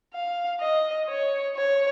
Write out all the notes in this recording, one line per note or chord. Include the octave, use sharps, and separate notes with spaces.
F5
D#5
C#5
C#5